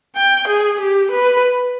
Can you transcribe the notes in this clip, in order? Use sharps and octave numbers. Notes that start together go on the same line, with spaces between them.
G5
G#4
G4
B4